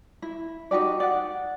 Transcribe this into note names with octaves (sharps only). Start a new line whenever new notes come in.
E4
D#4 F#4 G4 D5
D5 F#5